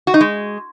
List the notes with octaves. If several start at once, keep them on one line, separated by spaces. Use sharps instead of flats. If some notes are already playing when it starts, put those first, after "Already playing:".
F#4
D#4
G#3